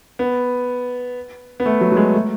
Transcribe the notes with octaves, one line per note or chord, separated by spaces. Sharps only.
B3
B3
A3
F#3
F#3
G#3
A3